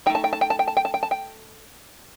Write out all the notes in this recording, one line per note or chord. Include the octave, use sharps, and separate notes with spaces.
A3 D#4 G5
A5
G5
A5
G5
A5
G5
A5
G5
A5
G5
A5
G5